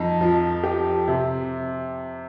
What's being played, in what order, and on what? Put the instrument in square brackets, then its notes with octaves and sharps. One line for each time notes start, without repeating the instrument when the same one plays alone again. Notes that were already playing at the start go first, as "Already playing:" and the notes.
Already playing: [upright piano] F2 D#4
F3
G4
C3